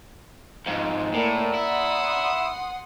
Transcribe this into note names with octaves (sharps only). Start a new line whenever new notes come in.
F2 G#2
A2 A#3 E4 D5 A#5
E4 F#5 C6 D#6